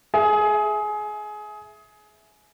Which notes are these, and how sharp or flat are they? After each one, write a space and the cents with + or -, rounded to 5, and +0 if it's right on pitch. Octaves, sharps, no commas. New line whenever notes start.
G#4 +20 E5 +0